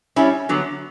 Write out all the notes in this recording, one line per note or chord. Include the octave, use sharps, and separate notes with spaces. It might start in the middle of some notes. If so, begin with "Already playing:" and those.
G3 C#4 E4
D3 F#3 B3